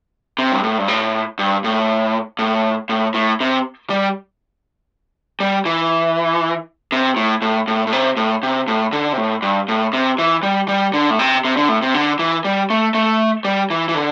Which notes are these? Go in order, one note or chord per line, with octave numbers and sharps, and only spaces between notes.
C3
G2
A2
G2
A2
G2
A2
A2
A2
A2
C3
G3
G3
E3
C3
A2
A2
A2
A2
C3
A2
C3
A2
D3
C3
A2
G2
A2
C3
E3
G3
G3
D3
A2
C3
C3
D3
A2
C3
D3
E3
G3
A3
A3
G3
E3
E3
D3